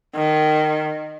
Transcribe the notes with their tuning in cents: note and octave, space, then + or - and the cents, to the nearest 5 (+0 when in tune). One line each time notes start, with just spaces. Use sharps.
D#3 -20